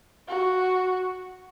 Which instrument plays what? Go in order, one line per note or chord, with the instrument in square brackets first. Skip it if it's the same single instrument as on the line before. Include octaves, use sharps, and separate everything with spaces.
[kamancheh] F#4